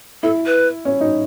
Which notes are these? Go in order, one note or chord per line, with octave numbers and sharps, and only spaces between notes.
E4 A4
B4
C#4
D#4